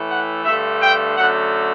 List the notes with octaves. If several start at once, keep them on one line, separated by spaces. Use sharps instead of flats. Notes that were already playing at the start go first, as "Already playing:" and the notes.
Already playing: A2 E3 A3
F#5
G2 D3 A3 E5
G5
F#2 D3 A3 F#5